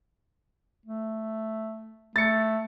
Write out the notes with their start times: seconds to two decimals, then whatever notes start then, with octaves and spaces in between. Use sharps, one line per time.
0.86 A3
2.16 A3 A6 C#7